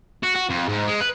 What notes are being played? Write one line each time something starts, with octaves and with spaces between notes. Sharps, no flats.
F#4
F#4
F2
G#2
G#3
B4